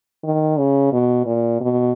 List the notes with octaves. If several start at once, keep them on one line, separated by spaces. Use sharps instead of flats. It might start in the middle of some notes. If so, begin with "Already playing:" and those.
D#3
C#3
B2
A#2
B2